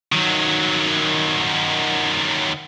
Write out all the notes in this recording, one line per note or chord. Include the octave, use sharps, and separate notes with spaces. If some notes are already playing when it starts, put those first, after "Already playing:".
D#3 F#3